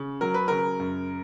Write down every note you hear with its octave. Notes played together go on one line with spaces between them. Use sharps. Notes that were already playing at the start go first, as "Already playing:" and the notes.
Already playing: C#3
F#3 A#4
B4
C#3 A#4
F#2